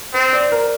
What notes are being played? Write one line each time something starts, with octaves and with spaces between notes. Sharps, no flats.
C4 C5
D5
A#4